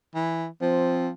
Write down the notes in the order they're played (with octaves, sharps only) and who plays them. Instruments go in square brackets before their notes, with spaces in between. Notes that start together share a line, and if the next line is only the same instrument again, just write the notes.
[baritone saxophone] E3
[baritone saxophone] F3 [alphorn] C4